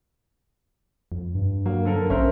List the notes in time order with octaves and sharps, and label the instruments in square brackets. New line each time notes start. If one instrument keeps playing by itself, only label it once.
[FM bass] F2
[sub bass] G2
[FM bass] F#3 [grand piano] A#3
[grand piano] D3 A4 A#4
[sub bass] A#1 [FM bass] C#4 [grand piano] A#4 C5 E5